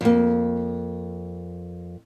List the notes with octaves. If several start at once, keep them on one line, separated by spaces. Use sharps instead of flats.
F2 A#3